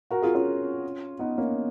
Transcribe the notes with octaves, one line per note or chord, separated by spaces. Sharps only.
F#4 A#4
F4 G#4
C#4 F4
B3 D#4
A#3 C#4